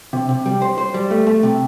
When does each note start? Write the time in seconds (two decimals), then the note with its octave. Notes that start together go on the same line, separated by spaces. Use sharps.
0.13 C3
0.29 C3
0.46 G3
0.62 C5
0.78 C5
0.94 G3
1.11 A3
1.27 A3
1.43 C3